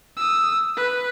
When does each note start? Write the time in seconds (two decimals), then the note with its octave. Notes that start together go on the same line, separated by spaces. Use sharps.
0.17 D#6 E6
0.77 B4